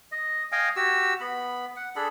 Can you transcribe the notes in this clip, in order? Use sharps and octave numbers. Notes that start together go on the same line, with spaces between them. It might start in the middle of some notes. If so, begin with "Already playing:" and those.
D#5
D#5 F5 G5 G#5
F#4 G4 E6
B3 B5
F#5
D4 G#4 A4 B5